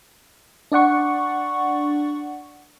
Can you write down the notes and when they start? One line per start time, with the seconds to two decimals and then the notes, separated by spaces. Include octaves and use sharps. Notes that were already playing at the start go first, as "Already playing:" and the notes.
0.72 D4 D5 F#5 C#6